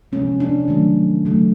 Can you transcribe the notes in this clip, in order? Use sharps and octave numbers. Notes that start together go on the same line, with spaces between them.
C3 F3 G#3 C#4
D4
D#3 F#3 A3
C#3 F#3 A3